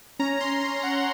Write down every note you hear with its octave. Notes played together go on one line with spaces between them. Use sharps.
C#4 A#5
C6
C#4
A#5
C#4
F#5